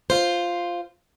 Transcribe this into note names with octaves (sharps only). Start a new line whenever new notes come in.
F4 C5